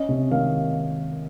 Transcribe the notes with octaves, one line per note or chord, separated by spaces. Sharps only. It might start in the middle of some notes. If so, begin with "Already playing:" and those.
Already playing: C#4 D#5
C3
D#3 F5